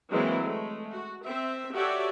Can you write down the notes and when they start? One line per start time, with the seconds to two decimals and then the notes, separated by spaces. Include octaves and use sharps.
0.11 E3 F#3 G#3 A#3 C4 E4
0.44 G#3 A3
0.91 F#4
1.24 C4 E5
1.74 F#4 G4 A4 C#5 D5 E5